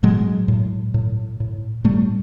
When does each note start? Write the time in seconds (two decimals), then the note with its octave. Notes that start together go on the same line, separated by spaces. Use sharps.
0.03 A2 F#3 G#3
0.48 A2
0.94 A2
1.40 A2
1.84 A2 G3 A3